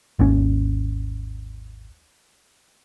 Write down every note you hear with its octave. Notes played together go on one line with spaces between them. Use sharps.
G#1 D#2 C#4